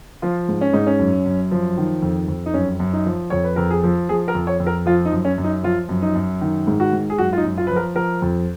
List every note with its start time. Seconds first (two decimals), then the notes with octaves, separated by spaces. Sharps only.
0.22 F3 F4
0.48 G#2
0.61 C#4
0.73 G#2 D#4
0.87 C#4
0.99 F#2
1.26 F#2
1.51 F3
1.78 D#3
2.02 F2
2.28 F2
2.46 D#4
2.54 F#2 C#4
2.80 F#2
2.93 D#4
3.06 F3
3.30 F2 C#5
3.44 B4
3.56 F2 A#4
3.71 G#4
3.84 F3
4.09 F3 G#4
4.28 A#4
4.35 F2
4.47 C#5
4.60 F2
4.66 A#4
4.86 F3 F4
5.05 D#4
5.12 F#2
5.25 C#4
5.38 F#2
5.44 D#4
5.63 F3 F4
5.89 F#2
6.02 D#4
6.15 F#2
6.41 D#3
6.67 G#2
6.80 F#4
6.93 G#2
7.10 G#4
7.18 F#2 F#4
7.33 F4
7.37 D#4
7.44 F#2
7.57 F4
7.67 F3 B4
7.76 A#4
7.95 F3 A#4
8.22 F2